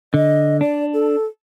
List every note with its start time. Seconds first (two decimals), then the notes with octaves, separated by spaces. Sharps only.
0.14 D3 D#5
0.61 D4 D5
0.93 A4